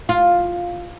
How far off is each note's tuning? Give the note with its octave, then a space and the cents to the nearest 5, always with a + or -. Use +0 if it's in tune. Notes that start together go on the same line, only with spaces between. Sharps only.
F4 +5